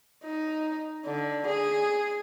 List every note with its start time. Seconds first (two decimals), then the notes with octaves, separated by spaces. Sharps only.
0.24 D#4
1.06 D3
1.47 G#4